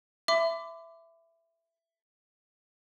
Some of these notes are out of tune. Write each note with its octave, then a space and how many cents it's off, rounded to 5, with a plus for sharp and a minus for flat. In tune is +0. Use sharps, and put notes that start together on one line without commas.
E5 +10 B5 +40 D6 +0